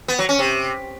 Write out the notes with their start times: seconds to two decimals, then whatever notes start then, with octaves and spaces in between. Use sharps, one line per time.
0.08 B3
0.19 F#3
0.29 C#4
0.39 C3